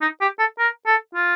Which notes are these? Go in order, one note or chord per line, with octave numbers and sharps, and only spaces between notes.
D#4
G4
A4
A#4
A4
F4